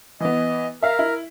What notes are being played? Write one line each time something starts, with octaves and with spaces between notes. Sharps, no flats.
E3 B3 D#5
A#4 E5 F5
E4